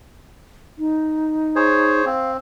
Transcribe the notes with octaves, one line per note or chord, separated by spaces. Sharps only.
D#4
G#4 C5 C#5
C4 F5